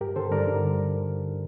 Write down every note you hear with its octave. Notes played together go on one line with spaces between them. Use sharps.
G2 G4 A#4
D3 A4 C5
G2 A#4 D5
D3